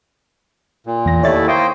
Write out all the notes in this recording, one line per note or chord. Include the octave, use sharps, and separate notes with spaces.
A#2
E2 A#6
D#2 A3 E4 C#5 D5 A6
A#3 C5 G5 C#6 D#6 A#6